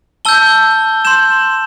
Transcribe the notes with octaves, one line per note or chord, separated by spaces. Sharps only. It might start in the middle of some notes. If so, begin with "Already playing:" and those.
A5 E6 G6 G7
C6 G6 E7